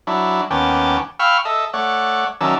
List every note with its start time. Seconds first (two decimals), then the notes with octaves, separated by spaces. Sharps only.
0.07 F#3 D4 E4
0.51 D#2 B3 C#4 G5 A5 D6
1.20 F5 G5 B5 C#6 E6 F6
1.45 A4 D#5 E5
1.74 A3 C#5 D5 F#5
2.41 D#3 F#3 C#4 D5 E5 A5